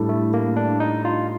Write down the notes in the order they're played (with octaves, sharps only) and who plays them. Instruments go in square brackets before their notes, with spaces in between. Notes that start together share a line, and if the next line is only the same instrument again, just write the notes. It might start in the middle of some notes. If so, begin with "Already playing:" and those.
Already playing: [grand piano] A2 G3 D4 A4
[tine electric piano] A3
A#3
D4
D#4
F4